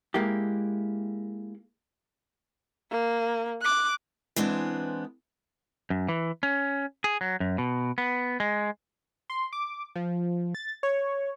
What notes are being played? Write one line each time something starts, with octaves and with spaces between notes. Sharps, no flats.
G#3 A#3 E4 G4
A#3
D6 F#6
E3 G#3 B3 C4 D4
F#2
E3
C#4
G#4
F#3
F#2
B2
B3
G#3
C6
D6
F3
A6
C#5